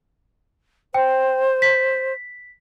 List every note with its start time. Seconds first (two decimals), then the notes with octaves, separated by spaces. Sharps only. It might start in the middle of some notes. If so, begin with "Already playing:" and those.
0.94 C5 G5
1.62 B6